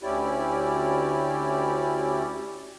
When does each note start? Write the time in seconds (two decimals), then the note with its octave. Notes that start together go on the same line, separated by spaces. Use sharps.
0.03 D2 C#4 E4 G4 D5